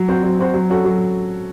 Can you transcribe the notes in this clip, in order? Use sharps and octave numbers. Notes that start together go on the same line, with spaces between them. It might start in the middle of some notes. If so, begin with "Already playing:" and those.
Already playing: F#3
C4 F#4 C5
F#3
C4 F#4 C5
F#3
C#4 F#4 A4
F#3